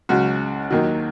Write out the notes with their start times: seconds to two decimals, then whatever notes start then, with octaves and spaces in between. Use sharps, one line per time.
0.09 C#2 C#3 F#3 F#4
0.70 D#2 D#3 F#3